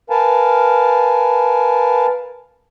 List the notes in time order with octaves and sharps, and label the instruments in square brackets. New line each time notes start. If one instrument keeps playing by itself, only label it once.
[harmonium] A#4 B4 F5 G#5 A5